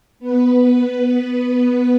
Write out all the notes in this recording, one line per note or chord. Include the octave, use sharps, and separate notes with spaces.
B3 B4